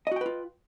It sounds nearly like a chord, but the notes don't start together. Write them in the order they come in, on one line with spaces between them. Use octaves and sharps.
D#5 F#4 G5 B4 F4